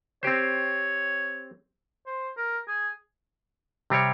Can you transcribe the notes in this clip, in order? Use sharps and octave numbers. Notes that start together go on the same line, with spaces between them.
C4 G4 C5 C#5
C5
A#4
G#4
C3 G3 C4 G4 C#5